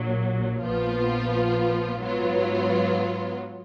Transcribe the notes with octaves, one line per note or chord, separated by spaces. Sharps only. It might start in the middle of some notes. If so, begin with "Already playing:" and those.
Already playing: A#1 A#2 F#3
A#1 A#2 F3 B3 F4
G#2 F#3 B3 F4